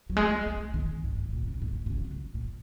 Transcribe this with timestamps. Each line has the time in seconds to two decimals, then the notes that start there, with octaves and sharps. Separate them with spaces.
0.10 F#3
0.17 G#3
0.31 A#3
0.46 G#3
0.60 G#3
0.74 D#3
1.04 G#2
1.18 G#2
1.33 A#2
1.48 C#3
1.62 G#2
1.76 A#2
1.86 A#2
1.90 C#3
2.05 F#3
2.34 A#2